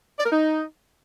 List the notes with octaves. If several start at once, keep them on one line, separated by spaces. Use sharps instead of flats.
D5
A#4
D#4